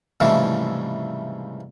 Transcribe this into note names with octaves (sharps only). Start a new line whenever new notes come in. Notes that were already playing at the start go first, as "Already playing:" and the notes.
C2 G#2 C#3 E3 F3 A3